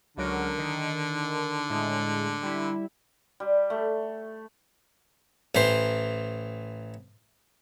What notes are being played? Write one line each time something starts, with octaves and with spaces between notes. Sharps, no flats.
C#2 D3 F#3 A#4
D#3
A2 G#3
G3 E4
G3
A3
A1 E3 C5